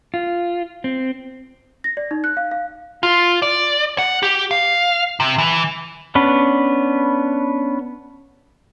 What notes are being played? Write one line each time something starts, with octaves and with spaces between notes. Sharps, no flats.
F4
C4
A#6
D5
D#4
F#6
F5
F5
F4
D5
F#5
G4
F5
C3
E3
B3 C#4 D4 B4